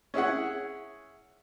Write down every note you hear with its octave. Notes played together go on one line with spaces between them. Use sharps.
C#4 E4 G#4 F#5